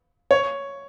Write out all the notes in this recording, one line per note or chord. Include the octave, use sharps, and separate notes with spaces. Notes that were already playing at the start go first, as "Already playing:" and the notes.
C#5